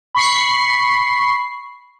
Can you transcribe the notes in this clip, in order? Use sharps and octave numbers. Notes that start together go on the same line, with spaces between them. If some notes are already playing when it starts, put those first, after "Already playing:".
B5 C#6 C7